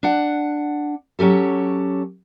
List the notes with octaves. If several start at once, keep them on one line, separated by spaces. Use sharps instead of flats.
D4 F#5
F#3 C#4 G4 A4